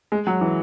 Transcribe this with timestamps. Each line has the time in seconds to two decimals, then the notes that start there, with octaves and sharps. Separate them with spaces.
0.12 G#3
0.27 F#3
0.41 E3